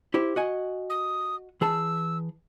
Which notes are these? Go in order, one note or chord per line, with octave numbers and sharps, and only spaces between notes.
E4 G4 C5
F#4 D#5 G#5
D#6
E3 G#4 A5 E6